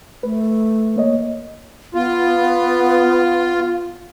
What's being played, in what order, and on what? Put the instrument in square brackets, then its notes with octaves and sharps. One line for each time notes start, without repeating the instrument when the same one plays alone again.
[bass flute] A3 [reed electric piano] B4
[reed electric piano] A#3 C#5 D#5
[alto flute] B3 [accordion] F4